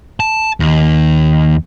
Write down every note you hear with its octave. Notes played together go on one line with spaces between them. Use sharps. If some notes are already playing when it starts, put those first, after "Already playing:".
A5
D#2